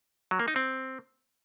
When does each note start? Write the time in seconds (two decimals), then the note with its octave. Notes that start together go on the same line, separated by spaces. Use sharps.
0.31 F#3
0.39 A#3
0.48 D#4
0.56 C4